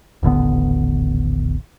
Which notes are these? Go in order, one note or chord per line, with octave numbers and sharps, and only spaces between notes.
D#1 A1 D3 B3